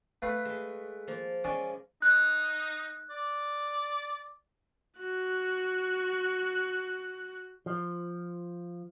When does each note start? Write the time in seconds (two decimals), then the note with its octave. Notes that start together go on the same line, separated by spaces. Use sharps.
0.22 A3 B4 F5
0.45 G#3
1.08 F3 A#3
1.44 G#3 C#4 D5
2.02 D#4 F#6
3.10 D5
5.00 F#4 F#6
7.66 F3